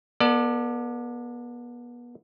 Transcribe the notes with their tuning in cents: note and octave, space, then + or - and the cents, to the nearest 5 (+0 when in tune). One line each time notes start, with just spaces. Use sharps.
B3 -35 A4 +15 D5 +20